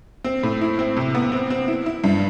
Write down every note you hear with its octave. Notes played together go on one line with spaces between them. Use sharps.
C4
A2
E4
C4
C3
B3
C4
C4
E4
E4
G2